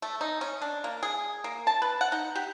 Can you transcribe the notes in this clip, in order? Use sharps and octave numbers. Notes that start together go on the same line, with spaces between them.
A3
D#4
C#4
D4
A#3
G#4
A#3
A5
B4
F#5
D#4
G4